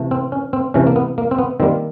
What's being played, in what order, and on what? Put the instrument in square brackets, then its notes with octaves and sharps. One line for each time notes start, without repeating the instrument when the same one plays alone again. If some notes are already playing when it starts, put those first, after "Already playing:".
Already playing: [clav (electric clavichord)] C3 E3 A3
C4
C#4
C4
C3 E3 A3 C#4
A#3
B3
A#3
C4
B3
D#3 G3 A#3 C4